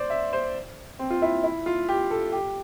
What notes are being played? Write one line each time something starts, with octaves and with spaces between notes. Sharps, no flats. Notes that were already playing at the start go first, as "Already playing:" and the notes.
Already playing: C5 D5
E5
C5
C4
F4
E4
E4
F4
G4
A4
G4